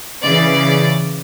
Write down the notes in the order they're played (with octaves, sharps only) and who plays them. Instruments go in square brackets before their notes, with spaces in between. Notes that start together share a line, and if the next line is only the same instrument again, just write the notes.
[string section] C#3 E3 D5